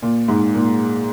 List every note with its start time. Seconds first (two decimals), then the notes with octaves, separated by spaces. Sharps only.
0.02 A#2
0.28 G#2
0.54 A#2